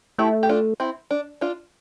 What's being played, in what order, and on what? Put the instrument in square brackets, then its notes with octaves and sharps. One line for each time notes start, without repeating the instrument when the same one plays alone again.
[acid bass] A3 [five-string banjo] E4 G4
[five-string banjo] G4
D4 F4
C4 E4
D4
D4 F4